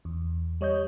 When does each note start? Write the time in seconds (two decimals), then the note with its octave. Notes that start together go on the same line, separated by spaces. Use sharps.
0.05 E2
0.61 G3 C#5 D#5 G6